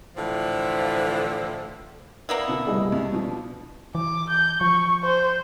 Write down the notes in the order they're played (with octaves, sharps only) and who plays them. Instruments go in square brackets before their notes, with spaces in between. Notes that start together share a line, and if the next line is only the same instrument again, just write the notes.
[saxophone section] A2 D3 E3 F3
[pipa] A#3 B3 E4 [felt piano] D5
[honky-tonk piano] B2 D3 [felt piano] C#7
[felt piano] C2 E3 G3 [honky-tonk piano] A3 G#4 D#5
[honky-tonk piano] G2
B2 F3 D4
[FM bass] E3 [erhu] D6
[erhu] G6
[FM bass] F3 [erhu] C#6
[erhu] C5